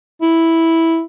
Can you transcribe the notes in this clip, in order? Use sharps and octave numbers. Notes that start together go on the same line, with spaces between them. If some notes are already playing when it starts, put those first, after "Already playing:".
E4